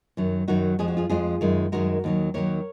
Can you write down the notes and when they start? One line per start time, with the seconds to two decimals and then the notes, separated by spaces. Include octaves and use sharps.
0.17 F#2 D#3 F#3
0.48 F#2 D#3 F#3 D#4 F#4
0.79 F2 F3 G#3 G#4
0.88 F#4
0.97 F4 G#4
1.10 F2 F3 G#3 F4 G#4
1.41 F#2 D#3 G#3
1.72 F#2 D#3 G#3 F#4 A#4
2.04 D#2 D#3 F#3
2.34 D#2 D#3 F#3 A#4 C#5